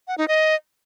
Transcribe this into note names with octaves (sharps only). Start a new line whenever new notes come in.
F#5
D#4
D#5